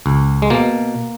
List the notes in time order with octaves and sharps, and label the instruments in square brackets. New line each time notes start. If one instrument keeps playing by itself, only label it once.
[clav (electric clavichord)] C#2
G#3
B2 A#3